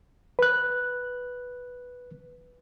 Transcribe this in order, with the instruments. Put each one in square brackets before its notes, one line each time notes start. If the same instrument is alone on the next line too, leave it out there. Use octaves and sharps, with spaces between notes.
[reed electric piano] B4 F#6